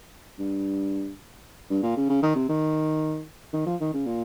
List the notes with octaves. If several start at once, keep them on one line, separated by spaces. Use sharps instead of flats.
G2
G2
A#2
C#3
C#3
D#3
C3
D#3
D#3
F3
D#3
C#3
A#2